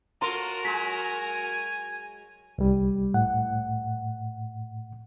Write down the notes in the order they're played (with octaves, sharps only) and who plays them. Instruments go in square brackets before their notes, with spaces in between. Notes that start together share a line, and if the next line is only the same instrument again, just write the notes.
[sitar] F4 A4 C#5 [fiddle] F#4 A#4 [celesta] A#5 C6
[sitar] F#3 G#3 [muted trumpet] G#5 [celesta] B6
[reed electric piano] C2 G3
A2 F#5